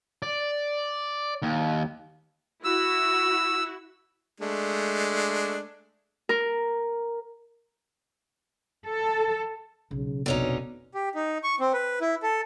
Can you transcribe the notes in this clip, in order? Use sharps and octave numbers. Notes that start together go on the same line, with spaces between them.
D5
D#2
E4 F#4 E6
G#3 A3 D4
A#4
A4
B1 C#3
F1 A#1 B2 D3 C#4 D#4
G4
D#4
C#6
C4
B4
E4
A4